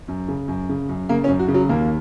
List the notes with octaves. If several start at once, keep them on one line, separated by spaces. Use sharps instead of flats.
F#2
C#3
F#2
C#3
F#2
C#3 A#3
C#4
F#2
F#4
C#3
F#3
D#2 A#3